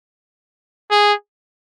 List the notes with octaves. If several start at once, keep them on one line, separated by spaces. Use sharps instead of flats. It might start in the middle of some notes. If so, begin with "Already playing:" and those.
G#4